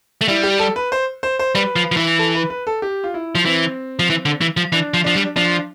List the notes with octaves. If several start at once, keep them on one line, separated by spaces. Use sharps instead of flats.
A3
G3 E4
G4
A4
B4
C5
C5
C5
G3 B4
F3
F3
E3
A4
B4
B4
A4
G4
F4
E4
F3
E3 C4
F3
E3
D3
E3
F3
E3 D4
F3
F3 D4
G3
F3 D4